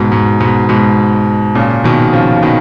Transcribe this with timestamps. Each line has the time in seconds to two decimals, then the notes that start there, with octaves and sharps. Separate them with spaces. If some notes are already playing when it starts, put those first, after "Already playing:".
Already playing: G#2 B2
0.12 G#2
0.40 G#2 B2
0.69 G#2 B2
1.55 A#2 C#3
1.84 B2 D#3
2.13 C#3 F3
2.36 C#3
2.43 B2 D#3